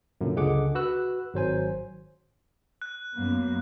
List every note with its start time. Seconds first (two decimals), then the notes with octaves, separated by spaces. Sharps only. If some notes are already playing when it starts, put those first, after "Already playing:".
0.21 F#2 A#2 D3
0.36 C#2 D3 G#3 G#4 F#5 D6
0.75 F#4 B4 E6 F#6
1.34 G#1 F#3 C5 G#5
2.82 F#6
3.14 F#2 A#3 B3